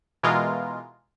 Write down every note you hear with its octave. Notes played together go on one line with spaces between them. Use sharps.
B2 E3 G#3 F4 A#4